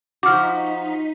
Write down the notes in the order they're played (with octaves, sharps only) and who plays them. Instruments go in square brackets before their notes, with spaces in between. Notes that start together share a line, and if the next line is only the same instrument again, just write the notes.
[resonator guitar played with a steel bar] F3 F#4 [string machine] D#4 B6 [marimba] D6 F6